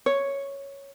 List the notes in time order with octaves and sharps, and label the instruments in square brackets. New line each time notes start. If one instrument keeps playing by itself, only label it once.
[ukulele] C#5